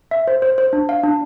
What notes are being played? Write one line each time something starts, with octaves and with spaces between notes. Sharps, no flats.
E5
C5
C5
C5
D4
F5
D4